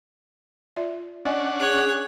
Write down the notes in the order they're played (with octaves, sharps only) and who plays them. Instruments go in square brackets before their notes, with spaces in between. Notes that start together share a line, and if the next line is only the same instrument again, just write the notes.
[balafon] F4 D5 E5
[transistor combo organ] C#4 D4 F#5 [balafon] D5 D#5 G#5
[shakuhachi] G#4 [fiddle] C#5 F#6